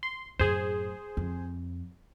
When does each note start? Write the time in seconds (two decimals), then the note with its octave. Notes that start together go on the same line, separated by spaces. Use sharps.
0.03 C6
0.39 F#2 A2 G#4 C5
1.17 F2